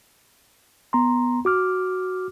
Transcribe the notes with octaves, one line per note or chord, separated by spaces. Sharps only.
B3 A#5 C6
F#4 D6 F6